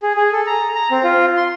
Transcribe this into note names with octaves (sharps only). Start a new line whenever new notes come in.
G#4
G#4
A4
A#5
A#5
C4
F4
C6